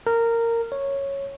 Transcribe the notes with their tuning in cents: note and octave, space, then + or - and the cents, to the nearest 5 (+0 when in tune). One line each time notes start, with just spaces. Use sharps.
A#4 -15
C#5 -5